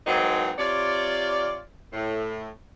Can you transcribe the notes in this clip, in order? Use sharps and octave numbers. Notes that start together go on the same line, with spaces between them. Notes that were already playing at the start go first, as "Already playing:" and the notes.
G#2 E3 F#3 A#3 C4 D#4
C3 F4 C#5 D5
A2